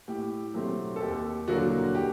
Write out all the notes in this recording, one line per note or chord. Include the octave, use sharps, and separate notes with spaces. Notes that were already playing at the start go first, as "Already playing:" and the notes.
A2 G4
F#3 A3 C4 G4
A4
D#2 G4
D3 F#3 A#3 F#4
G4